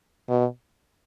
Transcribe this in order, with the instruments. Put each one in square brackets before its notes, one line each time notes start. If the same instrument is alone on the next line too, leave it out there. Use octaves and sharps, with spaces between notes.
[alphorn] B2